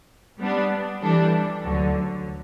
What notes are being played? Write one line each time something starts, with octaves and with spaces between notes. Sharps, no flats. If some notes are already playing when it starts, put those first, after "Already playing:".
G3 B3 D4
E3 G3 D4 A4
D2 D3 F#3